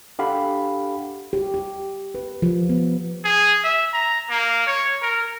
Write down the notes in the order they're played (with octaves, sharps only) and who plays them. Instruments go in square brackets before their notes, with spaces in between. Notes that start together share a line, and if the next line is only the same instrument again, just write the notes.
[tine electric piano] D4 G4 A4 F5 F#5 B5
[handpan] G4
G4
B4
F3
B3
[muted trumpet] G#4
E5
A#5
A#3
C#5
A#4